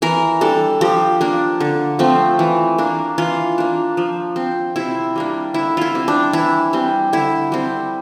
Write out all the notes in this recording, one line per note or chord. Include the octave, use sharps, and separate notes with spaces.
E3 A#4
G3 D4 A4
F3 G4
A#3 D4
D3
F3 A3 C4
E3
A#3 D4
E3 F4
A#3 D4
F3
C4
C3 E4
G3 A#3 D4
D3 E4
E4 F4
G3 C4
D4
E3 E4
G3 C4
D3 E4
G3 C4